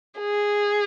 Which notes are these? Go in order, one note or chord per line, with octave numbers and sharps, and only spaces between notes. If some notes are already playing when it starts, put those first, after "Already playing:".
G#4